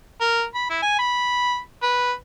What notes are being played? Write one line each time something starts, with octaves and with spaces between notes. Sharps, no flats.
A#4
B5
E4
G#5
B5
B4